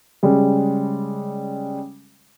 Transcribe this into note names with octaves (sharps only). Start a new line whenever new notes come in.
C#3 G3 G#3